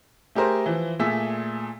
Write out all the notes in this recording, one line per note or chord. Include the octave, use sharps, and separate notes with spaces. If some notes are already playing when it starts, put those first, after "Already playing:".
A3 G4 G#4 A#4 C5
E3 F3 E4
A#2 A3 G#4 E6 B6